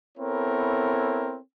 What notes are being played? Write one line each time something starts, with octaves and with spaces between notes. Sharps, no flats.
B3 C4 E4 A4 A#4 C#5